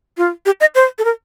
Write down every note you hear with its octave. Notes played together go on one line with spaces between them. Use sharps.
F4
G4
D#5
C5
A4
A#4